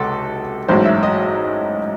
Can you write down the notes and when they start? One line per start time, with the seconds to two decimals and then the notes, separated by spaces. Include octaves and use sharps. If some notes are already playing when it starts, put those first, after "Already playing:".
Already playing: C#2 C3 F#4 A4
0.68 A1 G#2 F#3 C5
0.85 E5
1.03 D#5